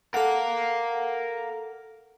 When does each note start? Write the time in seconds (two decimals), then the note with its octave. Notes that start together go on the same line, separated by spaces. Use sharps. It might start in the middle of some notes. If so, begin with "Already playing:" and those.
0.14 A4 A#4 F5 F#5